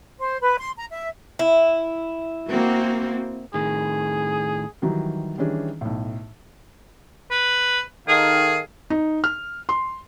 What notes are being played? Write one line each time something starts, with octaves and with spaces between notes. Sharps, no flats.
C5
B4
C6
A#5
E5
E4
A#3 C4 F#4
A2 D#3 G#4
D#3 E3 F#3 G3 D#4
D#3 E3 G3 C#4 D4 G#4
B1 A2
B4
D#3 G#4 A4 F5
D#4
F6
C6